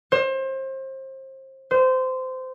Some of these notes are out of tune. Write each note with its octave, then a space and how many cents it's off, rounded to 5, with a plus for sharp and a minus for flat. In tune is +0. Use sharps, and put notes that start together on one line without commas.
C5 +30
C5 -20